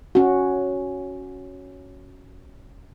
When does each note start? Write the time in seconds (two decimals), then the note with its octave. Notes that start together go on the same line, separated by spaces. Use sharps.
0.15 C#4 F#4